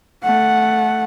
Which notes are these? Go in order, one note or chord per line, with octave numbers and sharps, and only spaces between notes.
A3 F#5